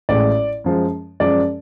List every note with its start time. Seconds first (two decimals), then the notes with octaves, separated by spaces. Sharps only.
0.09 A1 A2 G#3 D5
0.64 F#2 F3 G#3
1.20 F#2 F3 G#3 D5